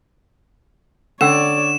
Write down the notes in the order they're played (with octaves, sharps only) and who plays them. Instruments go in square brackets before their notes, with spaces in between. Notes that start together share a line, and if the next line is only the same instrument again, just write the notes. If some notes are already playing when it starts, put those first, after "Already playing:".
[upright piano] D3 [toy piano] C#4 F#5 E6 [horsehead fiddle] C#5 D5 [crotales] E7